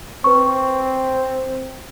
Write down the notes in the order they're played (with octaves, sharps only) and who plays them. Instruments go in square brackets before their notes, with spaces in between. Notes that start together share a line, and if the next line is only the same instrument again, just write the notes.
[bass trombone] C4 [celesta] B4 C#6